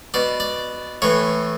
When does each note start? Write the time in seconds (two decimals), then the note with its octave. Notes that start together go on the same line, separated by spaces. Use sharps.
0.14 B2 D5
0.40 D5
1.02 A2 E3 C#5